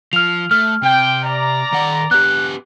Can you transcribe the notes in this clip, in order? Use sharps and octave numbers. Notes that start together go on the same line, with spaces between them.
F3 F6 F7
A3 F6
C3 G5
D5 A#5
D#3 F#5
B3 G4 F#6